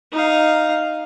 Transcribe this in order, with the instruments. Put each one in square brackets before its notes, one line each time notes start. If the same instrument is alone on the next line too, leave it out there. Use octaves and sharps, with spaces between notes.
[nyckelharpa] D#4 F5